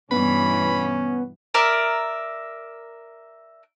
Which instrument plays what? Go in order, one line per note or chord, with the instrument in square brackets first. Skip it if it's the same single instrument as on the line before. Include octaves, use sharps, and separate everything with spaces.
[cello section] G2 B2 E3 [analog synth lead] B3 [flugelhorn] C#4 [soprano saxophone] B5
[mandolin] A#4 D5 E5